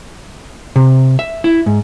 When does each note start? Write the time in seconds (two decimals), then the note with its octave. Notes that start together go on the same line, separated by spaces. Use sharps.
0.76 C3
1.19 E5
1.44 E4
1.66 G#2